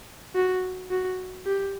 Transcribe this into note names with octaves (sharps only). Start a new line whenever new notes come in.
F#4
F#4
G4